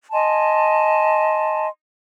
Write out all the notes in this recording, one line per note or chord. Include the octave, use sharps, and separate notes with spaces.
D#5 G#5 A5 C6